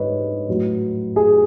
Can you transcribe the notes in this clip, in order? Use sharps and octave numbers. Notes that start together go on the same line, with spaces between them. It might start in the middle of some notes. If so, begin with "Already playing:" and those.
Already playing: G#2 B4 C#5 D#5
A2 F#3
G#4